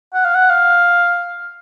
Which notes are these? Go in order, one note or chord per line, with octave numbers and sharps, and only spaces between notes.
F#5
F5
F#5
F5